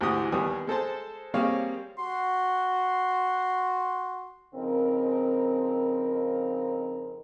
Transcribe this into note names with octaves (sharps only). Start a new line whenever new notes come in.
D2 G#2 E3 F#4 G4 D#6
D#2 G3 B3 G#5 D#6
G#3 A4 C5 A5
G3 A#3 C4 G#4 C#5 F5
F#4 C6
F2 C#3 C4 D#4 A#4